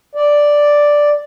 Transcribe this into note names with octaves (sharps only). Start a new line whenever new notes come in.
D5